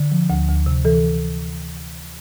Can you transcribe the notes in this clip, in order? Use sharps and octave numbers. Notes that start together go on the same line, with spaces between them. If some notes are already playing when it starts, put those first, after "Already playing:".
Already playing: D3
F3
D2
D2
C3
E3 A4